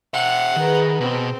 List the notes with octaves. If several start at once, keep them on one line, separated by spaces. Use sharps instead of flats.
E5 F#5 G5
D#3 G#4 B4 A#5
B2 C4